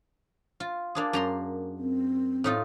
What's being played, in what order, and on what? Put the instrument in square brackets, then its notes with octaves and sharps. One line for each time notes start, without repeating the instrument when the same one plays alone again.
[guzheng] F4
A#3 D4 G#4
F#2 A#5 C6
[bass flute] C4
[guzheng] A2 D#4 F4